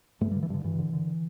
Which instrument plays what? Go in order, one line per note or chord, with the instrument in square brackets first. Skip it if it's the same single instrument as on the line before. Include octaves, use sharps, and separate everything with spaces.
[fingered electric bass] G2 A3
G3
D3
E3
G2 D3
G2 E3
D3
D3